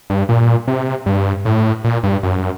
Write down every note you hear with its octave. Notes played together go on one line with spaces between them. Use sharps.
G2
A#2
C3
G2
A2
A#2
G2
F#2